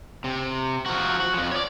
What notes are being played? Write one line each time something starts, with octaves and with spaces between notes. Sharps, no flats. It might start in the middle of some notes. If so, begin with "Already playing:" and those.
C3
F3 F#4
F#4
F2 F3
C#5 D5